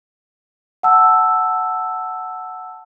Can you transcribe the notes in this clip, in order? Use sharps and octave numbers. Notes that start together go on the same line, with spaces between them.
F#5 A5 E6